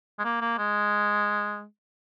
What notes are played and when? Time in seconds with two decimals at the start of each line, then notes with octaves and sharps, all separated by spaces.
0.19 G#3
0.24 A#3
0.41 A#3
0.58 G#3